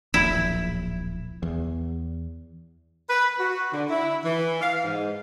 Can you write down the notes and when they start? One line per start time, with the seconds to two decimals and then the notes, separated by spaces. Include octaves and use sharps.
0.14 D1 A#1 E4
1.43 E2
3.09 B4
3.39 F#4
3.72 D3
3.90 E4
4.24 E3
4.61 F5
4.84 G#2